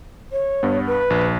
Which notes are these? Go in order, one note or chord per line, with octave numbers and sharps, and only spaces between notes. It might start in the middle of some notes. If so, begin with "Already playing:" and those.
C#5
G2 B3
B4
A#1